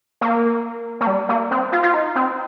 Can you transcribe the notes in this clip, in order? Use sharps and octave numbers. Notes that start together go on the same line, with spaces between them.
A#3
A#3
G3
A#3
C4
F4
F4
D#4
C4